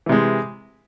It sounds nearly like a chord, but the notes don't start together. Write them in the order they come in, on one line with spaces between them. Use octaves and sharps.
E3 C3 G#3